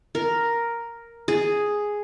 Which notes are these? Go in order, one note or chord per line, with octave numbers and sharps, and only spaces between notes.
A#4
G#4